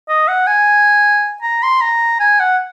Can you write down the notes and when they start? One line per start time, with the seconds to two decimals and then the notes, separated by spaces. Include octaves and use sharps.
0.09 D#5
0.28 F#5
0.47 G#5
1.43 A#5
1.63 C6
1.81 A#5
2.20 G#5
2.40 F#5